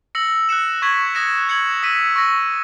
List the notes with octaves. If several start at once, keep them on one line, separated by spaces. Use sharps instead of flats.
E6 A#6 C#7 F#7
F#6 C#7 E7
C#6 G#6 B6 F#7
D#6 F#6 A#6 C#7 E7
G#6 C#7 F#7
E6 B6 D#7 F#7
C#6 E6 A#6